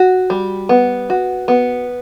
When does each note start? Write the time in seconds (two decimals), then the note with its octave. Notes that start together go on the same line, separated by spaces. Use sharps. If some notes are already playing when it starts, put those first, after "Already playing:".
Already playing: F#4
0.30 G3
0.69 B3
1.10 F#4
1.48 B3